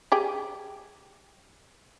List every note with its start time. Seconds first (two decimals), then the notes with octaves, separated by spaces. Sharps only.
0.12 G4 G#4 G5